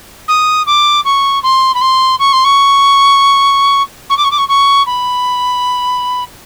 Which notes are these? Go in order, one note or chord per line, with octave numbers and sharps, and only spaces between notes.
D#6
D6
C#6
C6
B5
C6
C#6
C6
C#6
C#6
D6
C#6
D6
C#6
C#6
B5